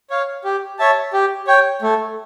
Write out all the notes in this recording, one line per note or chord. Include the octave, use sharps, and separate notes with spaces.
C#5 F5
G4
C#5 E5 A5
G4
C#5 G5
A3